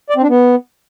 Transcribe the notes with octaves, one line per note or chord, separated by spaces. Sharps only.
D5
C4
D4
B3